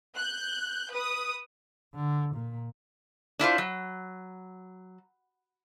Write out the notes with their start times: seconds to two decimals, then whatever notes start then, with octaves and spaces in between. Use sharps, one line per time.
0.17 F#6 G6
0.92 B4 D#6
1.95 D3
2.35 A#2
3.39 D4 E4 F4 C5
3.58 F#3